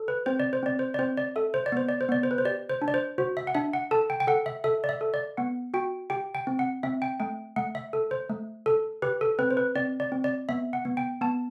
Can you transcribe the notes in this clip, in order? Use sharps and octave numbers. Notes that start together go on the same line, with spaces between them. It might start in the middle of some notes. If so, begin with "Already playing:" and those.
Already playing: A4
B4
C4 C5
D5
C5
C4 D5
C5
D5
C4 C5
D5
A4 E5
C5
D5
B3 C5
D5
C5
B3 D5
C5
B4
C5
G4 D5
C5
D4
D5
C5
F#4 C5
E5
F#5
D4 E5
F#5
A4 A5
G5
G5
A4 F#5
E5
A4 E5
D5
E5
A4
D5
B3 F#5
F#4 G5
G4 G5
G5
C4
F#5
C4 E5
G5
A3 G5
A3 F#5
E5
A4
C5
A3
A4
G4 B4
A4
C4 B4
C5
B4
C4 D5
D5
C4
D5
B3 E5
F#5
B3
G5
B3 A5